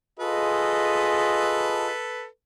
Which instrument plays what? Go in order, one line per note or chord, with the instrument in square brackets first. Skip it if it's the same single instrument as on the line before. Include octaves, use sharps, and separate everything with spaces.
[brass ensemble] F4 G#4 D#5 [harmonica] A4 B4